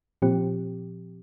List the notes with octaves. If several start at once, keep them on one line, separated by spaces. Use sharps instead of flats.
A#2 F3 C4 G4